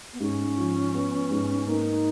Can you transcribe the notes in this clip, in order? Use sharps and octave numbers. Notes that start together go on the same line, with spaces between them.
B3
G#2 C#4
F3
B3
G#2
A#3 D#4